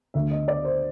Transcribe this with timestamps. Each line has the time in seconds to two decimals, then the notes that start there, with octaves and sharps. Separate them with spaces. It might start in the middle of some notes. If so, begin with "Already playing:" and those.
0.14 D2 D3 E5
0.31 D#5
0.48 D5
0.65 C5